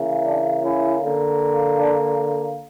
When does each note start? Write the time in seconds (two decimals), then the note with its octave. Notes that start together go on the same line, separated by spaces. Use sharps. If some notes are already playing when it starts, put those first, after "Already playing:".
Already playing: C#3 E3 A#3
0.24 D4
0.62 C#4 E4
1.01 D3 A#3
1.77 D4